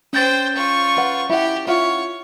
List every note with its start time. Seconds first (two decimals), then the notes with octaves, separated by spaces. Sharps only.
0.13 C#4 C5 G5 G6 A6
0.56 F4 C#6
0.97 B4 F#5
1.30 E4 G4 F#5
1.67 E4 F4 C#5 F#5